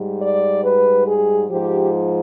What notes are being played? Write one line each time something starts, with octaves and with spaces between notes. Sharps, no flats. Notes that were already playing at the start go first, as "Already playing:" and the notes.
Already playing: G#2 G3
D5
B4
G#4
G#2 F3 G4